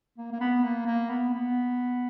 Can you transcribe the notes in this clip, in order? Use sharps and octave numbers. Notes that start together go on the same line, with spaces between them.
A#3
A#3
B3
A#3
A#3
B3
B3